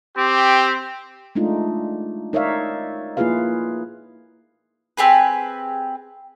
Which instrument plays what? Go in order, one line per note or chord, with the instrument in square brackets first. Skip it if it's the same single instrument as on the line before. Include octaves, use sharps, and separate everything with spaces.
[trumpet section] C4 G4
[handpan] G#3 A3 D4 D#4 F4
D#4 A#4 C#5 D5 E5 F5
A#3 E4 F4 G#4 B4 F5
[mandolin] C4 G4 G#4 B4